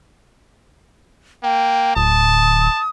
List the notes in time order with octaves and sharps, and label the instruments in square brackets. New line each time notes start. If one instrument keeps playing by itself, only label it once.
[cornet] A#3 [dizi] G5
[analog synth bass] D1 [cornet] A5 [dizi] D#6